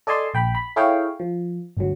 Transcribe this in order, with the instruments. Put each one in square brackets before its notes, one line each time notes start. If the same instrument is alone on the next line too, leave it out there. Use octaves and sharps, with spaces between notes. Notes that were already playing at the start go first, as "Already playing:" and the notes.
[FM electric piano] A4 D5 D#5 G#5 A5 C6
A#1 G5 B5
B5
E4 G#4 A4 C#5 F5 G5
F3
G1 D2 F#3